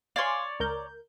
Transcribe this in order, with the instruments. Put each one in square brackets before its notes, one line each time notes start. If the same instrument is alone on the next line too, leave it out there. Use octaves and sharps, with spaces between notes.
[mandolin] C#5 D5 [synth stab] F5 G#5 C6
[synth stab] C#2 A#4 G6